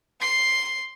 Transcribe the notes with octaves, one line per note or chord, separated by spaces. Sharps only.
C6 C7